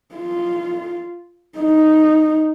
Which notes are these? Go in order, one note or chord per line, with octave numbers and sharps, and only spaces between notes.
F4
D#4